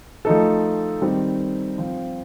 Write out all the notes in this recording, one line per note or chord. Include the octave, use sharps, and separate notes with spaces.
F3 A3 D#4 A4
D#3 G3 C4
F3 C4 F4